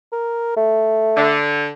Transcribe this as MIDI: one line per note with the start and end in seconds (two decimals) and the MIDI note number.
0.13 0.56 70
0.57 1.33 57
1.17 1.70 50